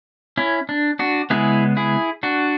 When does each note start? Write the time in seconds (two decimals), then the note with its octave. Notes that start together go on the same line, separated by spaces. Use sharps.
0.37 C#4 E4
0.69 D4
0.99 D4 F#4
1.30 C#3 G#3 B3 E4 G#4
1.77 E4 G#4
2.23 D4 F#4